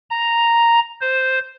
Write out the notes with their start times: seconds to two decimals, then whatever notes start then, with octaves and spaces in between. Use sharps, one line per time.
0.10 A#5
1.01 C5